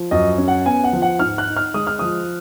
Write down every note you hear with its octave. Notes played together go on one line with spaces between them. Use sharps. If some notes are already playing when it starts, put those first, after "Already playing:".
Already playing: F3
F#2 D#5
C#4
F#5
B3 G#5
F#5
F3
F#5
G#2 F6
F#6
D#4
F6
G#3 D#6
F6
F3 D#6